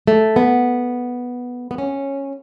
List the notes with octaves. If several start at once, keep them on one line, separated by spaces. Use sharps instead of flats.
A3
B3
B3
C#4